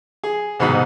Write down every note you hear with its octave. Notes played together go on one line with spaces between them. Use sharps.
G#4
C2 G#2 B2 D#3 B5